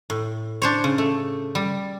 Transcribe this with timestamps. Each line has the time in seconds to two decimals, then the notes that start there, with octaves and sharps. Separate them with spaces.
0.10 A2
0.62 D4 C5 C#5
0.84 C#3
0.98 A3
1.55 G3